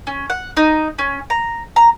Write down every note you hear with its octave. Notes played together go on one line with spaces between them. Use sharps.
C#4
F#5
D#4
C#4
A#5
A#5